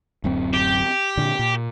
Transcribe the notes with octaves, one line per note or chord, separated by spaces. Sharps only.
D1 F#2 C4
G4
A#2 D3
A#2